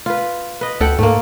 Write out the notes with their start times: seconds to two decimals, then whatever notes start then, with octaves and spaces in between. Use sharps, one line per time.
0.06 F4 B4
0.61 B4 D#5
0.80 D2 A4 F#5 G5
0.99 G#2 A3 A#3